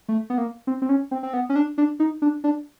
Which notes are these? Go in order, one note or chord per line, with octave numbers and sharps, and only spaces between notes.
A3
B3
A#3
C4
C4
C#4
C4
C4
B3
C#4
D4
D4
D#4
D4
D4